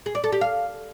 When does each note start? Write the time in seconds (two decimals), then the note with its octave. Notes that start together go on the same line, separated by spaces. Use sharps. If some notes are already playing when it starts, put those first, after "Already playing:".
0.06 G#4
0.15 D5
0.24 A4
0.32 G4
0.41 F5